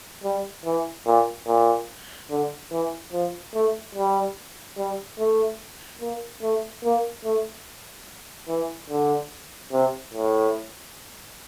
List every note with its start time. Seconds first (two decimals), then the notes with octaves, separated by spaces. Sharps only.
0.24 G3
0.65 E3
1.06 A#2
1.47 A#2
2.31 D3
2.72 E3
3.13 F3
3.54 A3
3.95 G3
4.78 G3
5.19 A3
6.01 A#3
6.42 A3
6.84 A#3
7.25 A3
8.49 E3
8.90 D3
9.72 C3
10.14 A2